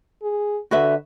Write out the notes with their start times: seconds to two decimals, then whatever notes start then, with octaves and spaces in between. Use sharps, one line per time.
0.22 G#4
0.71 D3 F#4 B4 E5